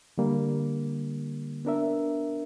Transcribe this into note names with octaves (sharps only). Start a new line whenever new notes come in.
D3 G3 A#3
B3 D4 A#4 E5